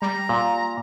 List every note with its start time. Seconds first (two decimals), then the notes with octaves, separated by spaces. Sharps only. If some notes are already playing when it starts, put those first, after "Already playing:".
0.02 G3 A#5
0.29 A#2